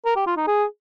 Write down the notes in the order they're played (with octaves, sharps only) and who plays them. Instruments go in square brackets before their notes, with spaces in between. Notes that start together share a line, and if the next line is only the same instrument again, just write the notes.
[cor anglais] A#4
G4
F4
D#4
G#4